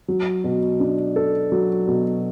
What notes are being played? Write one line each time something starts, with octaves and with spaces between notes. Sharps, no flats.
F#3
B2
D4
A4
F#3
B2